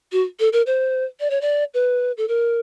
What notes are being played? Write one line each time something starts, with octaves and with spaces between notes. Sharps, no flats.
F#4
A4
A#4
C5
D5
C#5
D5
B4
A4
A#4